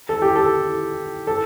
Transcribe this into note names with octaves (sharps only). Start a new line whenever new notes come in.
A4
G4
A4
A4